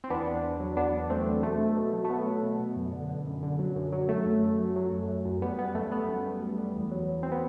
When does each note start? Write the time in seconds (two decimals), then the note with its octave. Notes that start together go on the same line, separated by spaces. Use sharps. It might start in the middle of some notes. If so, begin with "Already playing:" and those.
0.04 C4
0.10 E2 B3 D4
0.27 E2
0.43 E2
0.60 F#3
0.77 E2 B3 D4
0.93 E2
1.10 E2 A3 C4
1.27 E2
1.43 B2 A3
1.60 B2
1.76 B2
1.93 F#3
2.05 A3
2.10 B2 B3
2.27 F#3
2.43 B2
2.59 B2
2.76 F#2
2.93 D3
3.09 D3
3.26 F#2
3.43 D3
3.59 F#3
3.76 F#2
3.92 F#3
4.09 F#3 A3
4.26 F#2
4.42 F#2
4.58 F#3
4.76 F#3
4.92 F#2
5.09 F#2
5.25 F#2
5.42 G3 B3
5.58 G3 B3
5.75 F#2 A3
5.92 G3 B3
6.09 F#2
6.25 G3
6.42 G3
6.58 G3
6.75 E2
6.91 F#3
7.08 F#3
7.23 C4
7.32 B3